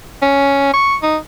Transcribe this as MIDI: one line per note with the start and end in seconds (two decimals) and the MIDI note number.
0.22 0.69 61
0.74 0.96 85
1.02 1.17 63